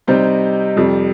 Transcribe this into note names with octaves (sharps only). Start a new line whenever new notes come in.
C3 G3 D#4 C5
F2 C3 G3